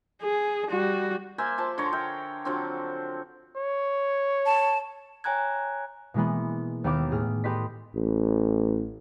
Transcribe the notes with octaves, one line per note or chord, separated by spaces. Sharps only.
G#4
G3 F#4
A#3 C5 E5 G#5
F3 A5
D3 C#5 A#5 C6
A#4 E5 G5
D3 F3 F#3 C4
C#5
A5
C#5 G5 G#5 A#5 F#6 G#6
B2 E3 G#3 A#3 B3
D#2 B3 G4 F5 D6 E6
A2 G#4 F6
G4 A4 B4 D#5 C6 B6
A1